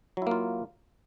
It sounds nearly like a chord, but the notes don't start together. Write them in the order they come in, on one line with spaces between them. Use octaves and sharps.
F#3 E4 A#3 F4